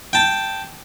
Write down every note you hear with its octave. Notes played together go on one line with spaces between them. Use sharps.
G5 A5